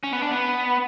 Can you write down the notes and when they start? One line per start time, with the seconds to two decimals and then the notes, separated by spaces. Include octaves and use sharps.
0.03 C#4
0.13 B3
0.22 D4
0.31 B3